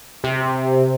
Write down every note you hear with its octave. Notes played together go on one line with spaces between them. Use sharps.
C3